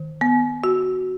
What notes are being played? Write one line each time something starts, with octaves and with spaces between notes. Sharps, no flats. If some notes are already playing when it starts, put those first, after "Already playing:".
Already playing: D#3
B3
F#4